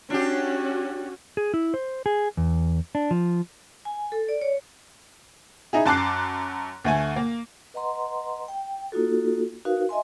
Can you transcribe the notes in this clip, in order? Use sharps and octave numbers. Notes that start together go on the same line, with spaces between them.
C#4 D4 F#4 G4
G#4
E4
C5
G#4
E2
D4
F3
G#5
A4
D5
C#5
D#4 E4 G#4
F#2 A5 D6 F#6 C7
D2 A3 G#5
A#3
B4 D#5 F#5 A#5 C6
G5
A#3 D#4 F4 F#4 A4
D#4 F#4 A#4 B4 F5
D#5 E5 G#5 C6